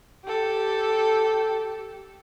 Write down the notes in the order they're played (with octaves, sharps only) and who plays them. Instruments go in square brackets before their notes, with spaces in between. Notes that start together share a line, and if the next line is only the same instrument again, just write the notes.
[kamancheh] G4 A4